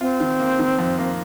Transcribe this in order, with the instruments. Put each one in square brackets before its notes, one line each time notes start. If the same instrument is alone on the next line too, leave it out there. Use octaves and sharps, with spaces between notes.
[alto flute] C4 [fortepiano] F4
[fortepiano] D#3
A#3
D#3
F2
A#3